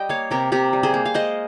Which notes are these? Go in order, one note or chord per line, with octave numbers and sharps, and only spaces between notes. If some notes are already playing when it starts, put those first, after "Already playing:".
Already playing: G3 D#5 G5
A#3 C#5 F5
C3 G4 A#4
C3 G4 A#4
G3
G#4 C5
A#3
F5
G#3 C5 D#5